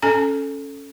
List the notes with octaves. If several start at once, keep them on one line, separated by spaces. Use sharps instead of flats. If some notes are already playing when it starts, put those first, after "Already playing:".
C#4 A4 G#5 A#5